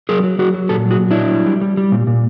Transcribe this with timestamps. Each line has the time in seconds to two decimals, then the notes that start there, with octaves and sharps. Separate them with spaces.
0.09 F#3 G#4 A#4
0.24 F#3
0.38 F#3 F#4 G#4
0.54 F#3
0.69 A#2 G4 A4
0.86 F#3
0.91 F#4 G#4
1.00 A#2
1.11 F#3 D4 E4
1.31 G3
1.46 G3
1.61 G3
1.77 G3
1.92 A#2
2.07 A#2